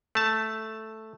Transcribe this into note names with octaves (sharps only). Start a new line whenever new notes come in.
A3 A5